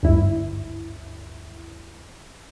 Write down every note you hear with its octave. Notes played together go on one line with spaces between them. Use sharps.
G#1 D2 G2 E4